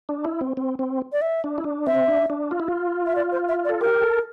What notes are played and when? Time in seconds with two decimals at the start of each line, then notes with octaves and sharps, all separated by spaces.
0.09 D4
0.25 E4
0.41 C4
0.57 C4
0.79 C4
1.12 D5
1.22 E5
1.44 D4
1.58 E4
1.64 D4
1.87 C4 E5
2.08 D4
2.30 D4
2.51 F4
2.60 E4
2.68 F4
3.06 E5
3.16 D5
3.32 C5
3.49 E5
3.65 D5
3.69 A4
3.81 G4 A#4
4.02 A4